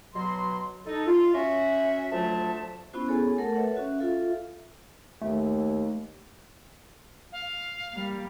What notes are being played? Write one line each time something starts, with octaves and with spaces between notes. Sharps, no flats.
B2 F#3 C6
D#4 A4
F4
C#4 F#4 E5
D2 F3 F#3 A3 E5 A5
B3 C#4 E4 F#4 C5
B3 G#4 A4 C#5 G#5
A3 A4 A#4 F#5
A4 B4 C#5 E5 F#5
C#4 F#4 E5
F4 A4 E5 F5
D#2 A3
F5
G3 A#3